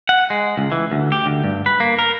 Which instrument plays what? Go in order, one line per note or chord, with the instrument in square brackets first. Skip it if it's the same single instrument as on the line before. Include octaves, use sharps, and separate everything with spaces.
[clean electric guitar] F#5
G#3
C#2
E3
D2
G4
D2
G2
B4
A#3
A#4